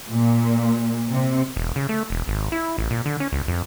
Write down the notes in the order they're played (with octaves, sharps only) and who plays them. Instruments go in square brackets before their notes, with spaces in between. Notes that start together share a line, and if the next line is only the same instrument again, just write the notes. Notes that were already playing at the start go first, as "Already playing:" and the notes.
[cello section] A#2
C3
[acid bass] E1
C#3
A3
E1
G#1
E4
A1
A#2
D3
C#4
C#2
F2